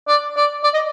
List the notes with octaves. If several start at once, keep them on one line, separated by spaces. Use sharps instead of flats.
D5
D5
D5
D#5